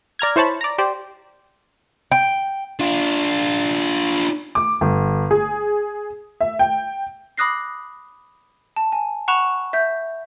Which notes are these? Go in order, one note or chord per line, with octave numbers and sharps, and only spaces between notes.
D5 A#5 F6 G#6
E4 C5 C#5 A5 B5
D5 A#5
G4 C5 D5
G5
D4 F4
D6
G1
G#4
E5
G5
B5 D6 D#6 F#6 A#6 C7
A5
G#5
F#5 B5 C#6 F#6 E7 F7
E5 G6